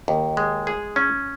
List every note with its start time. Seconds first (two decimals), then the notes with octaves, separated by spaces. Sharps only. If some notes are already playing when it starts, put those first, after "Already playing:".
0.08 D#2
0.37 G#3
0.67 G#4
0.96 C#4